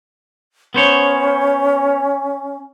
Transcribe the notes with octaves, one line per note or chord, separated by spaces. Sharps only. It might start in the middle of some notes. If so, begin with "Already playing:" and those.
B3 C#4 C5 C#5